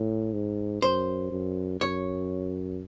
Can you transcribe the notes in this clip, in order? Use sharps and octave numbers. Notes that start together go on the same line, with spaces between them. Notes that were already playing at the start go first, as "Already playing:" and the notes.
Already playing: A2
G#2
F#2 C5
F#2
F#2 C#5